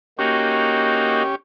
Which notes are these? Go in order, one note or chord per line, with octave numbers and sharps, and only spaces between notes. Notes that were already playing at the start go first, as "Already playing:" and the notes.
A#3 C#4 D#4 F#4 G4